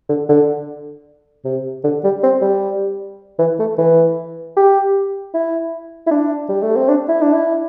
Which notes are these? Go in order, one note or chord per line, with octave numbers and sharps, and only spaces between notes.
D3
D3
C3
D3
G3
C4
G3
E3
A3
E3
G4
E4
E4
D4
G3
A3
C4
D4
E4
D4
E4